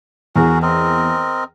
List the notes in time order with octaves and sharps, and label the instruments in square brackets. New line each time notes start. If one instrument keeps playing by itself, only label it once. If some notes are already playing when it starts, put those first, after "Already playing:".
[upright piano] E2 [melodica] F#4 G#4 A#4
[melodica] C4 A#4 D#5